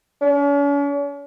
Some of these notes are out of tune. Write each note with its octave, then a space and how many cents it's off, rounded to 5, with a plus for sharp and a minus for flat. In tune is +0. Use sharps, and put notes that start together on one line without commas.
C#4 +45